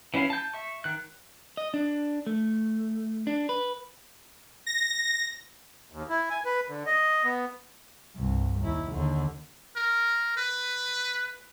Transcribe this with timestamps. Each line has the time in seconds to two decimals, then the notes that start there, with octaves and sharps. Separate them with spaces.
0.14 E3 C#4 E4 F5
0.30 A5 G6
0.54 E5 C#6
0.84 D#3 F#6
1.57 D#5
1.74 D4
2.27 A3
3.27 D4
3.49 B4
4.67 A#6
5.92 D#2
6.09 E4
6.30 G#5
6.45 B4
6.68 D3
6.86 D#5
7.24 B3
8.16 C2 G2
8.60 D#2 E4
8.91 D#2 D3
9.76 A#4
10.37 B4